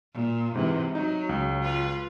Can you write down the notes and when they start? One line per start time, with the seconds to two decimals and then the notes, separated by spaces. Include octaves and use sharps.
0.14 A#2
0.55 G#2 C3 E3
0.95 F#3 D#4
1.29 C#2
1.63 F4 B4